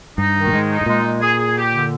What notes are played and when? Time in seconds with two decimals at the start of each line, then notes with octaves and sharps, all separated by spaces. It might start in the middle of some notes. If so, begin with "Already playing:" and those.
0.18 G2 D#4
0.36 D#3
0.47 A#2
0.52 G#2 G#3
0.70 D#4
0.81 G#2
0.86 A#2 G#3
1.03 G#3
1.21 G#4
1.38 G#4
1.56 G4
1.73 D3